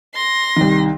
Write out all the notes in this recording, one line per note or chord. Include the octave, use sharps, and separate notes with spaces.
C6 A#6
C2 D#3